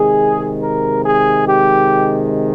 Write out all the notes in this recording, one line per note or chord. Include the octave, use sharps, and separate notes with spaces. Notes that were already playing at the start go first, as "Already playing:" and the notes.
Already playing: C3 D#3 G#3 G#4
A#4
G#4
G4